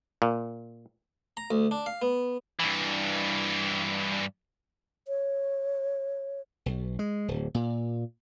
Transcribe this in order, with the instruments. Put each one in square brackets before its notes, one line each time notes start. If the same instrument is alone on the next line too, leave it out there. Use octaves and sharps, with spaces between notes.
[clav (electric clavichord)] A#2
[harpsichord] A#5
D2
D4
F5
B3
[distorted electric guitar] G2 E3
[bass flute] C#5
[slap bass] B1
G#3
D1
A#2